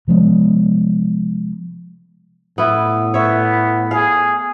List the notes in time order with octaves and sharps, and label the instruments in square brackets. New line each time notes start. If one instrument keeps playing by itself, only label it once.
[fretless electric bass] C3 F3 G#3 B3
[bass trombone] A2 [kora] B3 E4
[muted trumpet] B3 [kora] C#5 E5
[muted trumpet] G#4 [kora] F5